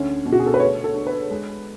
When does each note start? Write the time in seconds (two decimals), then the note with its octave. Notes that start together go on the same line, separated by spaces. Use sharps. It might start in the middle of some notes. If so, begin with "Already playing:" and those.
Already playing: D2 C#4
0.25 B2
0.32 F#4
0.40 G#4
0.46 A4
0.54 B4
0.60 A3 C#5
0.84 A4
0.95 D4
1.07 B4
1.30 G#3